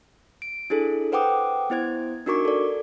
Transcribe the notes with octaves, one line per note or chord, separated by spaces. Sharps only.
D7
D4 E4 G#4 A4
B4 C5 F#5 G5 D6 D#6
B3 E4 C5 G#6
D4 D#4 F#4 A#4 C#6 D6
A4 D5